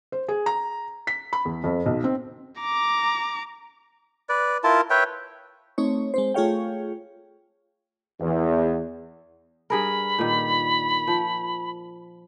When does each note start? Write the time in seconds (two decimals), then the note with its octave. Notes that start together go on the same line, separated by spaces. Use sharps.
0.12 C5
0.28 G#4
0.46 A#5
1.07 B6
1.33 B5
1.45 E2
1.64 F2
1.86 B1
2.04 C4
2.61 A#5 D6
4.29 B4 D5
4.64 E4 F4 A#4 A5
4.90 B4 C#5 E5 G5
5.78 A3 C4 D#4 C#5
6.14 G#3 C4 C5
6.34 A3 F4 G#4 C#5 F5 G5
8.20 E2
9.70 G2 G#4 A#4 B5
10.19 A#2 D#3
11.08 F3